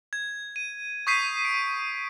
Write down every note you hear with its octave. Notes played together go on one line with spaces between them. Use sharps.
G#6
D#7
C#6 D#6 G6 B6 C7 D#7
D7